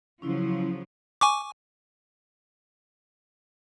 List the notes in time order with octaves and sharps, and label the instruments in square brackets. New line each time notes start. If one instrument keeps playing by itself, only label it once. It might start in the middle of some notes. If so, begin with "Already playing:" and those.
[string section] C#3 F3 F#3 [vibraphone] C#4 E4
[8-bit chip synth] G#5 C#6 D6